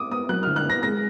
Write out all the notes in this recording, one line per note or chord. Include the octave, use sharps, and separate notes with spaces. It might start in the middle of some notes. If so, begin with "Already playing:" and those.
Already playing: D6 D#6
B3 D#6
F#3 F#6
D3 F6
F#6
B3 A#6
G#3 A#6